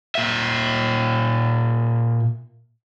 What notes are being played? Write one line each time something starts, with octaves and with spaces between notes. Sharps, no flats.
A#2 E5